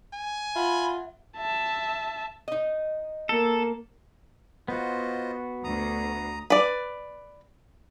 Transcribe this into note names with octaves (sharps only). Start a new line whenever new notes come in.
G#5
F4 E5 F#5 B5
E5 A5
D#4 D#5
A#3 A4
B3 F4 F#4 C5 D#5
D2 A#5 D#6
B4 D5